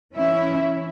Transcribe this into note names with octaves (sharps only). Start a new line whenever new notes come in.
E3 C#4 E4 E5